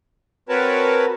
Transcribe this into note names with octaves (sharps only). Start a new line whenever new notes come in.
C4 F#4 A#4 B4 C#5 A5